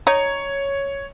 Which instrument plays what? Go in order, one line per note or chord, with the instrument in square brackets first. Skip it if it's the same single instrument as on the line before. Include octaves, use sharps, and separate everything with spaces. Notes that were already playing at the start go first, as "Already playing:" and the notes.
[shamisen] D#4 [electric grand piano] C#5